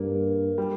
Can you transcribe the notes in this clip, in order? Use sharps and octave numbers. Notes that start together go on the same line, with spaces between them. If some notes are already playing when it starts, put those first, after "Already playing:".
Already playing: G2 A#3
G3